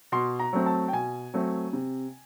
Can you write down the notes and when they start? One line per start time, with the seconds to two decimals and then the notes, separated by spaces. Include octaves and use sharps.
0.12 B2 C6
0.39 A#5
0.53 F#3 A3 C4
0.66 A5
0.88 G5
0.93 B2 G#5
1.34 F#3 A3 C4
1.73 C3